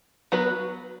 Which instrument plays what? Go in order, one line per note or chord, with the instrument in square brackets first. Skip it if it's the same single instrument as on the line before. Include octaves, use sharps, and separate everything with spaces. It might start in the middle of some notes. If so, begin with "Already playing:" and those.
[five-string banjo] F#3 B3 F#4 B4